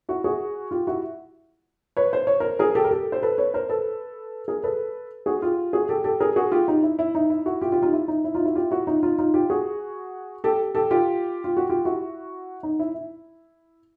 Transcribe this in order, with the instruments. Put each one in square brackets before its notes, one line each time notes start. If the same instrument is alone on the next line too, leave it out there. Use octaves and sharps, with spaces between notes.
[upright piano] E4 F#4
F#4 G#4
F4 G4
E4 F#4
B4 C#5
C5
C#5
A#4 C5
G#4 A#4
G4 A4
A#4
G4 A4
C5
A4 B4
B4 C#5
A#4 C5
A4 B4
G#4 A#4
A4 B4
F#4 G#4
F4 G4
F#4 G#4
G4 A4
G4 A4
G#4 A#4
F#4 G#4
F4 G4
D#4
E4
E4
D#4
E4
E4 F#4
F4 G4
F4 G4
D#4 F4
E4
D#4
E4
D#4 F4
E4 F#4
F4 G4
E4 F#4
D#4 F4
D#4 F4
D#4 F4
F4 G4
F#4 G#4
G4 A4
G4 A4
F4 G4
F4
F#4
F4 G4
E4 F#4
D#4
E4
E4